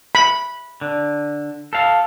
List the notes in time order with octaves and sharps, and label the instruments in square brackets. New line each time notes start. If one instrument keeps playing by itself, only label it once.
[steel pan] B5
[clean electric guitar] D3
A4 F5